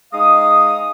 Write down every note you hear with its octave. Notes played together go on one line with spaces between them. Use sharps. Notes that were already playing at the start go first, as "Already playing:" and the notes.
G#3 D#4 F5 D#6